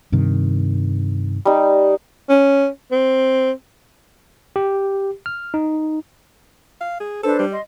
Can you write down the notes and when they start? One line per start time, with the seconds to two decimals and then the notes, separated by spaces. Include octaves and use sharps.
0.12 G2 C3 D#3
1.45 G3 D#4
2.29 C#4
2.92 C4
4.56 G4
5.26 F6
5.54 D#4
6.81 F5
7.00 G#4
7.24 D4 A4 B4 C5
7.39 G3
7.51 D#5 C6